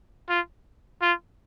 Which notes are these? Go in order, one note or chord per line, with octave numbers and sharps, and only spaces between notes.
F4
F4